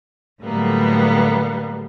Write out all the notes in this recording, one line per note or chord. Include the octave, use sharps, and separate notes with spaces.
A2 D3 F#3 G3 A#3 B3